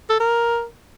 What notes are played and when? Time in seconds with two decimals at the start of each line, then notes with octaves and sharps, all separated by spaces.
0.09 A4
0.20 A#4